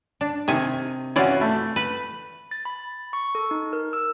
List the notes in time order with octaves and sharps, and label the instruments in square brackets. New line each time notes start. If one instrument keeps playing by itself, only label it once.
[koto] D4
[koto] C3 G#5 [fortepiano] D#3
[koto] E3 F4 D5 [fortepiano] C#4 F#4
[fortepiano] A3
[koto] B4
[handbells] A6
B5
C#6
A4
D#4
A#4
E6